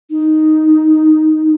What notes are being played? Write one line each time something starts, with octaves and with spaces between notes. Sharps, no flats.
D#4